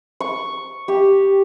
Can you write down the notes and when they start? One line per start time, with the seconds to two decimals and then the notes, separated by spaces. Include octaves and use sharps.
0.20 C#6
0.88 G4